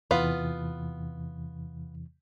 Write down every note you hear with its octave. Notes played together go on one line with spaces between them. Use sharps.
E2 C3 E3 B3 F4 B4